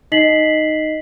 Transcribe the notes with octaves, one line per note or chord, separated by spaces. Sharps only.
D#4 D#5 B6 C7 F#7